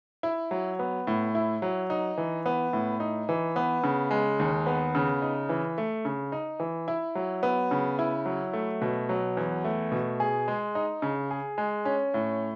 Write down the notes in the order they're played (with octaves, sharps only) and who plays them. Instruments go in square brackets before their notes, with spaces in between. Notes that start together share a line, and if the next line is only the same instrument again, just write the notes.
[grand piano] E4
F#3
B3
A2
E4
F#3
D#4
E3
B3
A2
D#4
E3
B3
C#3
G#3
D#2
B3
C#3
D#4
E3
A3
C#3
D#4
E3
E4
F#3
B3
C#3
E4
F#3
A3
B2
F#3
E2
A3
B2
G#4
G#3
D#4
C#3
G#4
G#3
C#4
A2